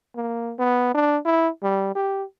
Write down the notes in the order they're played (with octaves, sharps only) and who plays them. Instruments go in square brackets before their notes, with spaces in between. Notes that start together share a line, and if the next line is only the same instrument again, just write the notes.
[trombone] A#3
B3
D4
E4
G3
G4